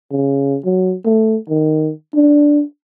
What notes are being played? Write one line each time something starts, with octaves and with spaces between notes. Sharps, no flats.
C#3
F#3
A3
D#3
D4